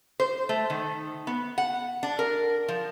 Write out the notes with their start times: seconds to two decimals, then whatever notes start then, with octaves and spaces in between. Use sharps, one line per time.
0.20 C5
0.49 A3
0.70 D#3
1.27 B3
1.58 F#5
2.03 D4
2.19 A#4
2.68 F3